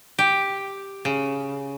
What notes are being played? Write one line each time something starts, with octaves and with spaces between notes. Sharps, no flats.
G4
C#3